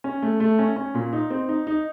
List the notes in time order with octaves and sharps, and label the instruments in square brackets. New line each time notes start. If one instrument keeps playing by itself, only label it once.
[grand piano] C#4
A3
A3
C#4
C#4
A#2
D#4
C4
D#4
D#4